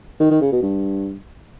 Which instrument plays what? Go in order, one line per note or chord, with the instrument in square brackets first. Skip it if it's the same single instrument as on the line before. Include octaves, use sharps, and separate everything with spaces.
[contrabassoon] D#3
D#3
C#3
B2
G2